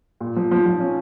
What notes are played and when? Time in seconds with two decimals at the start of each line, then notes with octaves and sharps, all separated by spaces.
0.21 A#2
0.36 F3
0.51 F3
0.66 F3
0.80 C#4